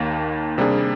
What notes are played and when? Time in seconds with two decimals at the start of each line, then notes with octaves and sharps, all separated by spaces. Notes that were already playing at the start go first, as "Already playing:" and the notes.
Already playing: D#2 D#3 A#3
0.58 C3 G3 A#3 D4 G#4